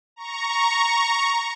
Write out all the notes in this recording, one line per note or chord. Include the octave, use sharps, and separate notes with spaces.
A#5 C#6